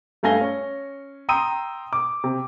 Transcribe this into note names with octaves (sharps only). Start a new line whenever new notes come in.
G2 A3 F5 G#5 A#6 G7
C#4
G5 A#5 C6 D#6 E6 D#7
D6
C3